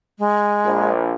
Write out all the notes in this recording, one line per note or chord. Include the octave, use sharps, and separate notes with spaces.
G#3
A#1